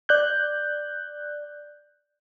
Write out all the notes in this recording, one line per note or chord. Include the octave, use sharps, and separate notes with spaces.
D5 F#6 G6